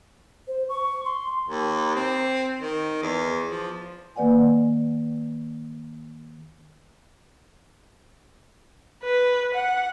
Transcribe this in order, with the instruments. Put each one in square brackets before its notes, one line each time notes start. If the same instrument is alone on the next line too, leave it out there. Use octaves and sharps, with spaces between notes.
[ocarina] C5
C#6
C6
[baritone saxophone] D#2
C4
D#3
E2
F3
[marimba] D#3 A#3 B4 D5 F#5 G#5
[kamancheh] B4
F#5